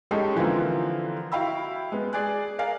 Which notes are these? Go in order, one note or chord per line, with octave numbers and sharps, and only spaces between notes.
G#3 C#4 D#4 G4 A4
D3 E3 F3 A#3 C4 F4
E4 F#4 F5 G5 B5 E6
G#3 B3
G#4 D5 G#5 F#6
A#4 D5 F5 G#5